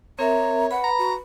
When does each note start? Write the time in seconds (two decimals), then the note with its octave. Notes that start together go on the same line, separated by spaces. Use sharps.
0.19 C4 A#4 C#5 E5 A#5
0.71 B4 F#5 B5
0.84 A#5
0.98 F#4